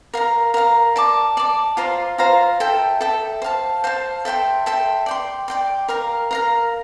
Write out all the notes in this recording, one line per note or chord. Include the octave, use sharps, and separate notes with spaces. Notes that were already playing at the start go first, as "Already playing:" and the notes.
A#4 F5 A#5
A#4 F5 A#5
D5 A5 D6
D5 A5 D6
F4 C5 F5 A#5
F4 C5 F5 A#5
A4 E5 G5
A4 E5 G5
C5 F5 A5
C5 F5 A5
A4 E5 G5 C6
A4 E5 G5 C6
D5 G5 C6
D5 G5 C6
A#4 F5 A#5
A#4 F5 A#5